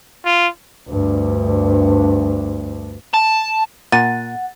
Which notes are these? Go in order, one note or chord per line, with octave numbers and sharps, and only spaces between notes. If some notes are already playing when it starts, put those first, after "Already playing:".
F4
D2 G2
A5
A#2 F#5 A6 D#7